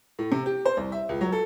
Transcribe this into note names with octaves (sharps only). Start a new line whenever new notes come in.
A2
C3
G4
C5
C2
E5
C#2
F#3
A4